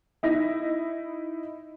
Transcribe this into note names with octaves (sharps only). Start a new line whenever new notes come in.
D#4 E4 A#6